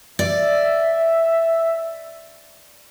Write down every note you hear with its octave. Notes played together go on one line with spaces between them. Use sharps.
D5 E5